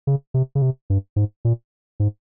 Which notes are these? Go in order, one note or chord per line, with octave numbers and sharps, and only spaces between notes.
C#3
C3
C#3
C3
G2
G#2
A#2
G#2